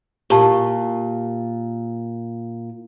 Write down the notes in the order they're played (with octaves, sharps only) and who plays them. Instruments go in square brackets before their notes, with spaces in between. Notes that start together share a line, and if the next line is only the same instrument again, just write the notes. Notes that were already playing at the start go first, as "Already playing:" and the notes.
[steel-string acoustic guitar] A#2 [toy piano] G4 A5 C#6